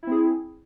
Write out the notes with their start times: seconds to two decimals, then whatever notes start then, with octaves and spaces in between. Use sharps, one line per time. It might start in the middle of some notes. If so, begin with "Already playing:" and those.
0.03 E4
0.07 C4
0.11 G#4